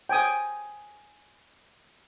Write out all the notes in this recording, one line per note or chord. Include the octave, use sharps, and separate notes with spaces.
G5 G#5 D#6